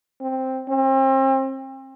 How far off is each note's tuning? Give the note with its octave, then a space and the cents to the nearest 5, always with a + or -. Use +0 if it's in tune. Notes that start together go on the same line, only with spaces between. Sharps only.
C4 +5
C4 +35